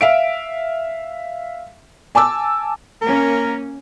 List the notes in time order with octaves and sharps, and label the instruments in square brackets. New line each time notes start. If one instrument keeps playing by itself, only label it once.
[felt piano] E5 F5 D7
G#5 A5 D6 E6
[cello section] A#3 C#4 [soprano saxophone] A#4